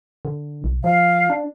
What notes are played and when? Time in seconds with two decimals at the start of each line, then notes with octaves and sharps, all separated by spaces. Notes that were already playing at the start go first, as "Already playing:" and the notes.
0.25 D3
0.64 B1
0.84 F3 F5
1.30 D4